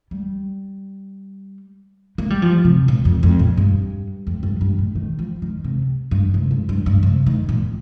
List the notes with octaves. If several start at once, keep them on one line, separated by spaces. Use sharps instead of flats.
G3
A#3
G3
F3
C3
A#2
F2
F2
A#2
G2
F2
G2
G2
A#2
D#3
F3
D#3
C3
G2
C3
G2
G2
G2
C3
D#3
A#2